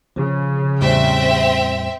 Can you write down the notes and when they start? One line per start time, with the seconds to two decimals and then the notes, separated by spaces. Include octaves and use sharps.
0.16 C#3 F3
0.81 E2 A2 G3 C4 E5 G5